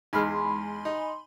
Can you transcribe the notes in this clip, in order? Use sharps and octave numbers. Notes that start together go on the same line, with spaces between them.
E2 G#3 D#4 G#5 B5 C6 F6
D#4